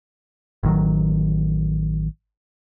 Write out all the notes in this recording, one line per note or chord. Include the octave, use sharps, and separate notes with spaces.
A1 D#3 F#3